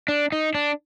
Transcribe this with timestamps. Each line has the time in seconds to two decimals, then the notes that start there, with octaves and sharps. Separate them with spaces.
0.08 D4
0.32 D#4
0.54 D4